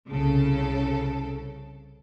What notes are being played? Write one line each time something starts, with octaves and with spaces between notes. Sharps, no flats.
C2 C#3 A4